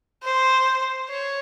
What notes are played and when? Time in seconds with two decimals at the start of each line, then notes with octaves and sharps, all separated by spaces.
0.24 C5
1.09 C#5